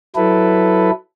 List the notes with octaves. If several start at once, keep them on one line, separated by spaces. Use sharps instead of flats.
F#3 E4 A4 B4